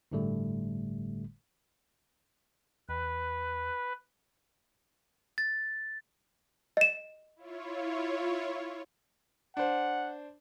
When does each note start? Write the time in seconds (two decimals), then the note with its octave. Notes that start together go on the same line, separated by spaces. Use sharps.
0.12 G1 A2 D3 G3 A3
2.89 E2 B4
5.38 A6
6.77 D#5 E7
7.36 E4 F4 C#5
9.57 D4 C5 F#5